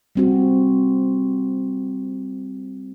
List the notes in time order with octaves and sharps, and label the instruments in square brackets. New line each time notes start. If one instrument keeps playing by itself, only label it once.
[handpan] G3 C4 F#4